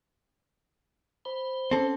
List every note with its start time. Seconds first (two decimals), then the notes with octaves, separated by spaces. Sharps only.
1.25 C5 B5
1.71 C4 C#4 A4